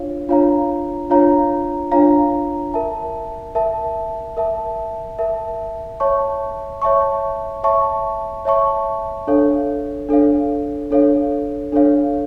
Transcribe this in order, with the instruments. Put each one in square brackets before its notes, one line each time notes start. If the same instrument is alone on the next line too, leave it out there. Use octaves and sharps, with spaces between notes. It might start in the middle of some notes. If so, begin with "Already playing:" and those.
Already playing: [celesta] D4 F4 C#5 F5
D4 F4 C#5 F5 A#5
D4 F4 C#5 F5 A#5
D4 F4 C#5 F5 A#5
A#4 E5 A5
A#4 E5 A5
A#4 E5 A5
A#4 E5 A5
C#5 E5 A5 C#6
C#5 E5 A5 C#6
C#5 E5 A5 C#6
C#5 E5 A5 C#6
D4 A4 C#5 F5
D4 A4 C#5 F5
D4 A4 C#5 F5
D4 A4 C#5 F5